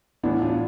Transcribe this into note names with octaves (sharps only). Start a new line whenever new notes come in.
A2 E3 B3 D4
D4 F4